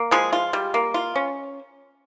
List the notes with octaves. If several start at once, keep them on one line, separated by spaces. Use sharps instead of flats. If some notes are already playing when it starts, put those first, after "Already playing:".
Already playing: A#3
F3 G#3 G#4
F4
G3
A#3
F4
C#4